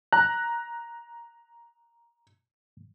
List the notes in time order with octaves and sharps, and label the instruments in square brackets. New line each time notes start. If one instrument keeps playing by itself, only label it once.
[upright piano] A#5 [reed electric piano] F#6